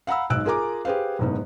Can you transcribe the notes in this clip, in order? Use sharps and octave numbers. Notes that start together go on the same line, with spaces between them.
F5 F#5 A#5 B5 E6
B1 G#2 E6 F#6 D7
F4 G#4 A#4 G#5 A#5 D6
G4 G#4 B4 C5 F5
F#1 G#2 B3